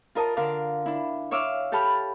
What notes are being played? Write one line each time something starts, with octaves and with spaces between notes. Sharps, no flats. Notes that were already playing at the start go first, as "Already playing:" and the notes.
F4 A#4 D#5 A5
D3 D4 A#4 F5 D6
D4 E4
C#5 E5 F5 D6 E6 F6
G4 A4 G5 A5 B5 F6